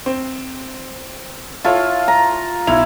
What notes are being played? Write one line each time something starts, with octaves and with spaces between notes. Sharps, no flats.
C4
E4 F4 A4 C#5
A#5
B1 E4 F7